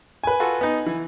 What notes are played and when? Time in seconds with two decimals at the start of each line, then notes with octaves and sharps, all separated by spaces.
0.24 B4 G#5
0.40 F4 F#4 A4
0.61 B3 D#4
0.86 E3